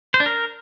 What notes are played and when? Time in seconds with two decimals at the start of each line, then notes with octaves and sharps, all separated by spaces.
0.14 C5
0.20 D4
0.26 A#4